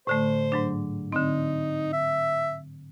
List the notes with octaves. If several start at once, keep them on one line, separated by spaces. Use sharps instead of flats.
A2 D3 A3 C5
G#2 F#3 D4
D3 C4 D#4
E5